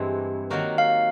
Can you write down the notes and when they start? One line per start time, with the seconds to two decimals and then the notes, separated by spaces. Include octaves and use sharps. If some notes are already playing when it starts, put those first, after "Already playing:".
Already playing: G2 E3 G#3 C4 E4
0.50 D#3 F#3 A#3 D#4 F#4
0.78 F5